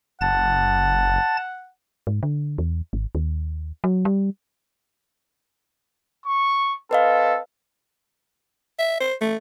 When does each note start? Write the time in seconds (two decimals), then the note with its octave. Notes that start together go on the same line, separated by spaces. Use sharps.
0.21 F#1 F#5 A5 A6
2.07 G#2
2.23 D3
2.58 E2
2.93 G#1
3.15 D#2
3.84 F#3
4.05 G3
6.26 C#6
6.91 C4 A4 B4 D#5 F5
8.79 E5
9.00 C5
9.21 A3